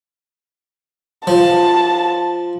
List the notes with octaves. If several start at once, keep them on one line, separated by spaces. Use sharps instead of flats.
F3 A5